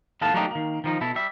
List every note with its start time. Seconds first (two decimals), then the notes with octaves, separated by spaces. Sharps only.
0.21 D#2 A2 B3 A4 F5 A5
0.34 F#3 A3 A#3 D4 D#4 G4
0.51 D#3 A#3
0.84 D#3 F3 D#4
1.01 B2 E4 A4
1.15 G3 E5